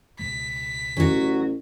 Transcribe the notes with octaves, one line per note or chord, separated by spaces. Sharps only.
C#2 B2 G#3 B6
A1 F#3 F#4